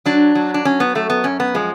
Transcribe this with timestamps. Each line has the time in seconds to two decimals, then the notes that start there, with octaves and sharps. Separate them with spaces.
0.06 F#3 D4
0.35 F#3
0.54 D4
0.65 F#3 C#4
0.80 B3
0.95 F#2 A3
1.10 B3
1.24 F#2 C#4
1.40 B3
1.55 F3 G#3